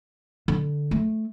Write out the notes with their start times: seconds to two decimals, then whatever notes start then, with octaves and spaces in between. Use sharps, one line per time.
0.48 D3
0.91 A3